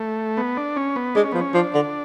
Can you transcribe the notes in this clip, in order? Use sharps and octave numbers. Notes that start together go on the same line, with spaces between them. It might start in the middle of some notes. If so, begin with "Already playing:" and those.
Already playing: A3
B3
D4
C#4
B3
G#3 D4
C#4
F3 B3
C#4
F3 D4
D3